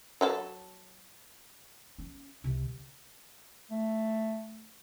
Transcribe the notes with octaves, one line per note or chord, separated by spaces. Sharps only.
F#3 A4 A5
C#4
C2 C3
A3